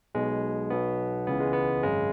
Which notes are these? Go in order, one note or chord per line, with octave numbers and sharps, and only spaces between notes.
B1 B2 G#3
B1 B2 B3
C#2 C#3 E3 B3
G#3
B3
G#1 F#2 C#3 G#3